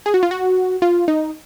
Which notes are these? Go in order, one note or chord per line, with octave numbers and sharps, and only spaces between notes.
G#4
F#4
F4
F#4
F4
D#4